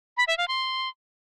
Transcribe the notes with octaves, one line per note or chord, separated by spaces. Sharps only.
B5
E5
F5
C6